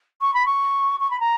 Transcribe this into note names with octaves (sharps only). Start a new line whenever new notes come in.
C#6
B5
C#6
C#6
B5
A#5